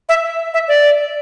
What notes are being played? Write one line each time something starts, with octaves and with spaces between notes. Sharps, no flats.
E5
E5
D5